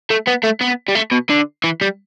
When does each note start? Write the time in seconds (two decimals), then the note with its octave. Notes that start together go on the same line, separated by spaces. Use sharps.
0.10 A3
0.28 B3
0.44 A3
0.61 B3
0.89 G3
0.95 A3
1.12 B2
1.30 D3
1.64 E3
1.81 G3